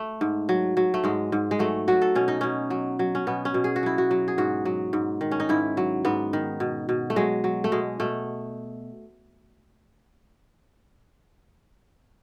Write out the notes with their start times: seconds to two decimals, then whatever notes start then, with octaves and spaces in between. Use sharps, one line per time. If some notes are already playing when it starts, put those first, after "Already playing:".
Already playing: A3
0.21 G#2
0.49 F#3
0.77 F#3
0.94 A3
1.04 G#2 G#3
1.32 G#2
1.51 G#3
1.59 F#3 A3
1.88 F#3 F#4
2.02 A4
2.15 B2 C#4
2.28 D#4
2.41 B2 C#4
2.70 F#3
2.99 F#3
3.15 C#4
3.27 B2 B3
3.45 C#4
3.54 B2
3.64 G#4
3.76 F#4
3.83 F#3 E4
3.98 F#4
4.11 F#3
4.28 G#4
4.38 G#2 F#4
4.65 F#3
4.93 G#2
5.21 D#3
5.31 C#4
5.40 D#4
5.49 G#2 E4
5.77 F#3
6.05 G#2 B3
6.33 D#3
6.60 B2
6.89 B2
7.10 A3
7.16 F#3 G#3
7.44 F#3
7.64 A3
7.72 B2 G#3
8.00 B2 A3